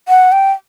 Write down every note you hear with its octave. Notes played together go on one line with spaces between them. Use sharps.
F#5
G5